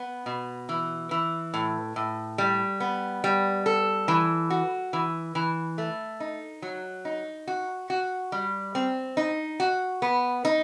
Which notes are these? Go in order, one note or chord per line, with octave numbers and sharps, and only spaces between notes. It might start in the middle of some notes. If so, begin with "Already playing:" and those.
Already playing: B3
B2
E3
E3
A2
A2
G3
B3
G3
A4
E3
F#4
E3
E3
A3
D#4
F#3
D#4
F#4
F#4
G3
C4
D#4
F#4
B3
D#4